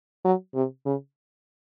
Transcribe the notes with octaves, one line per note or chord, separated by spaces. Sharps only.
F#3
C3
C#3